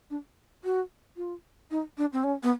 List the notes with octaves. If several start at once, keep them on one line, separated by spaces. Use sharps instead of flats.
D4
F#4
F4
D#4
D4
C4
C#4
B3